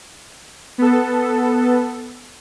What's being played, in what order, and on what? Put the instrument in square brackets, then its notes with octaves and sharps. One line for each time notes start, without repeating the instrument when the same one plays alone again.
[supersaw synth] B3 A4